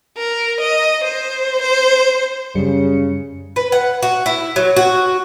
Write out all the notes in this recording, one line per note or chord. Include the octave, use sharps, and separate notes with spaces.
A#4
D#5
C5
C5
F#2 C#3 G3 C#7
B4
F#5
F#4
E4
F#3
F#4